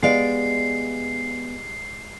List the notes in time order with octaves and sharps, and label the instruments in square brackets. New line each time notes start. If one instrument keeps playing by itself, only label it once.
[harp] G#3 D7 [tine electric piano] B3 [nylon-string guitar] G4 D5 F5 [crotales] C7